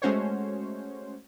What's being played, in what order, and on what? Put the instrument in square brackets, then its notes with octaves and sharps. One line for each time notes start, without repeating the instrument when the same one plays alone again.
[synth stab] G#3 A3 C#4 F#4 C5 C#5